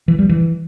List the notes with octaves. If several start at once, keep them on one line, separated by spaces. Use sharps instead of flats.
E3
G3
E3